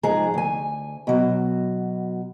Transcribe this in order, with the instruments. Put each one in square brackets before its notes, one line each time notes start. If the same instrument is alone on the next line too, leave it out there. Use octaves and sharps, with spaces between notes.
[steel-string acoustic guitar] G#2 F3 G#4 A#5
D2 G#5
B2 F#3